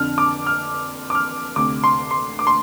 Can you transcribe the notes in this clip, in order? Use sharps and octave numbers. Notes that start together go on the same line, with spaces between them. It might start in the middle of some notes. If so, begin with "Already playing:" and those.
Already playing: F2 D3 F6
D6
F6
D6
F6
D2 C3 D6
C6
C6
D6
C6